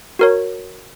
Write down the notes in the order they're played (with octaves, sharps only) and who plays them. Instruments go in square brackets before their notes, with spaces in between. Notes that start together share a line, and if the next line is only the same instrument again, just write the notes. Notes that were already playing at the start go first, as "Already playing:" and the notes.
[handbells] F#4 A#4 C#5